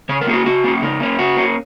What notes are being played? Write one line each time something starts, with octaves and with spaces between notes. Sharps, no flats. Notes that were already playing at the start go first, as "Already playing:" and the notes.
C#3 C#5
A#4
A#3 C#4 G#4
F#4
C#3 F#4
A#3 C#4
C#3 D#4
A#3 C#4
C#3 F#4
A#3 C#4